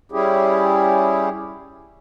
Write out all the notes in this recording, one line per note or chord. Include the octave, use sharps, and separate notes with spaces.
G3 C#4 E4 G4 G#4